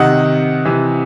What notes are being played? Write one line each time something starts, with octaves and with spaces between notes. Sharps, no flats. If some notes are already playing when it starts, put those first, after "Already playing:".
Already playing: C3 D#3 D#5 F#5
C3 E3